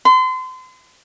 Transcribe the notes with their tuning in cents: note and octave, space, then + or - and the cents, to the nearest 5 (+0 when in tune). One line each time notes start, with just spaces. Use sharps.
C6 -35